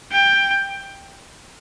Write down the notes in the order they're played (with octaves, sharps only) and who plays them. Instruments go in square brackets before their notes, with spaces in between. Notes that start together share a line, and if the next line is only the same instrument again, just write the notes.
[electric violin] G5